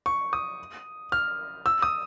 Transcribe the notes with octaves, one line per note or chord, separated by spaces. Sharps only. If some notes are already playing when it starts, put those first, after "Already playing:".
C#6
D#6
F6
E6
D#6